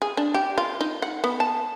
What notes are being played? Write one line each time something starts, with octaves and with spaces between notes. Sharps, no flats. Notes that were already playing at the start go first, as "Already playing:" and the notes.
G#4
D4
G4
F4
D#4
F#5
B3
A5